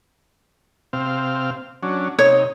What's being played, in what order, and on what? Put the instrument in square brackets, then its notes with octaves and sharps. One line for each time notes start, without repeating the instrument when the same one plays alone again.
[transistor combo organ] C3 C4 F5
F#3 C#4 D4
[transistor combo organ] C3 D#4 [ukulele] C#5